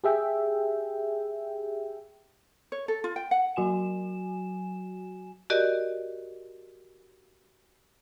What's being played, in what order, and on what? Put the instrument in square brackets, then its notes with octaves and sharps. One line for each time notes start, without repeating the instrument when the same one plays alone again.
[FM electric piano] G4 G#4 E5 G5
[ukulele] C#5
A4
F4
G5
F#5
[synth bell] F#3 F#4 G#5 E7
[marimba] F#4 G4 A#4 D5 D#5